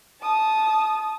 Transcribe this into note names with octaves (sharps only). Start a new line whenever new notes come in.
A5 D#6